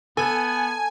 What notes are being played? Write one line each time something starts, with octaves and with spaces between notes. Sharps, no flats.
B3 A4 G#5